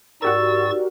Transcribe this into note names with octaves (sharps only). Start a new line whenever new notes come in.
G#2 F#4 G4 A#4 D5 C#6 E6 A6